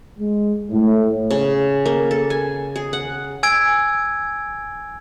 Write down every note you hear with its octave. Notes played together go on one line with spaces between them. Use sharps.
G#3
A2
C#3
A#3
A4
G#5
G#4
F#5
G#5 E6 G#6 D7